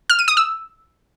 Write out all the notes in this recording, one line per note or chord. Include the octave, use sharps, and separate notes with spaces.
F6
D#7
D#6
E6